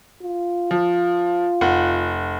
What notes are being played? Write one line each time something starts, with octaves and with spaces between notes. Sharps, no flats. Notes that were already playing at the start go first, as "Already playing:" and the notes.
F4
F3
F1 F#5